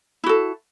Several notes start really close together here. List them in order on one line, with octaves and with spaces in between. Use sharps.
E4 F#4 A4